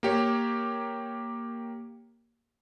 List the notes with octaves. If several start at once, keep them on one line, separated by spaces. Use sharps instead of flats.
A#3 G4 C#5